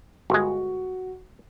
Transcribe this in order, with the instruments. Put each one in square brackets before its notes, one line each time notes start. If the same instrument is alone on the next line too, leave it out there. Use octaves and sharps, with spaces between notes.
[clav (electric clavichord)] G1 G#3 [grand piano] F#4